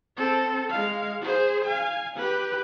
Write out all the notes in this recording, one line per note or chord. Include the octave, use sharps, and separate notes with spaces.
C4 A4
G#3 F5
G#4 C5
F5 G#5
G4 B4